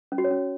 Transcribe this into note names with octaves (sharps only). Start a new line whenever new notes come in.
C#4
F#4
C#5
C#4